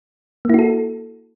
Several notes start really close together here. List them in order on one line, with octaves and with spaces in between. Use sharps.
A#3 E4 F#4 A4